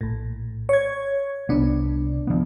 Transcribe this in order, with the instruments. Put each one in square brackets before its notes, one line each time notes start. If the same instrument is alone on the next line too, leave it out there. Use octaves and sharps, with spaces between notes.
[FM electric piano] A#1 A2
C#5 G#6
[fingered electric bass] C2 B3 [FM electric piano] C3 D4
[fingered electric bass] F3 B3